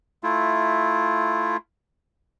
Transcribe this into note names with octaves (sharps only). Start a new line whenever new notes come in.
A3 E4 F4